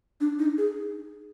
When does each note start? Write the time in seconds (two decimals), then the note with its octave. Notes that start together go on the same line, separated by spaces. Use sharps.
0.21 D4
0.39 D#4
0.58 G#4